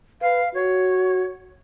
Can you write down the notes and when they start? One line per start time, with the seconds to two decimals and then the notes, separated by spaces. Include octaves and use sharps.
0.21 B4 F5
0.54 F#4 C#5